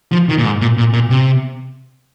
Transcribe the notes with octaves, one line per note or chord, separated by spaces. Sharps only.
F3
D#3
A#2
G#2
A#2
A#2
A#2
C3